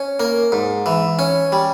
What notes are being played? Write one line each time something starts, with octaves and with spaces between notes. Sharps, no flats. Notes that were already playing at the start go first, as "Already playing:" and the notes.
Already playing: C#4
A#3
G#2
E3
C#4
G3